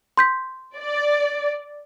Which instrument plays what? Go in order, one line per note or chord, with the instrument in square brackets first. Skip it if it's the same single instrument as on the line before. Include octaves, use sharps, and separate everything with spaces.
[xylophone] C6 G6 B6
[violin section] D5